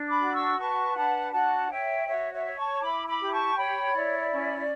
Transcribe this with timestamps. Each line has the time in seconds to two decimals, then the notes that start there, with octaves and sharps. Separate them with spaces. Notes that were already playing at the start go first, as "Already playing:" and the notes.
Already playing: D4
0.08 B5 D6
0.21 F#4
0.33 C#6 E6
0.58 B4 A5 C#6
0.96 D4 F#5 A5
1.32 F#4 F#5 A5
1.70 C#5 E5 G5
2.07 F#4 C#5 E5
2.33 C#5 E5
2.45 C#5
2.57 A5 C#6
2.82 E4 B5 D6
3.06 B5 D6
3.20 G4
3.32 A5 C#6
3.56 C#5 G5 B5
3.93 E4 D5
4.31 C#4